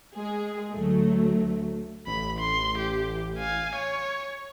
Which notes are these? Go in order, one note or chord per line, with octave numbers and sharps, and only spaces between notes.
G#3 G#4
D2 F#3 A3
A1 B5
C6
G4
F5 G#5
C#5